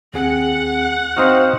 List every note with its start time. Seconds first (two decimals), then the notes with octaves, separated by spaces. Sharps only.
0.14 D#2 C4 G#4 F#5
1.17 C4 D#4 F#4 C5 F5 D#6 F6